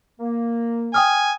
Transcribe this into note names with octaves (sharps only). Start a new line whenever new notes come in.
A#3
G5 G#5 D#6 F6